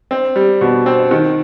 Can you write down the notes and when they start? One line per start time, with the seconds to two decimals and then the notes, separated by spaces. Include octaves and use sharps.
0.11 C4
0.36 G3
0.61 B2
0.86 C4
1.11 D#3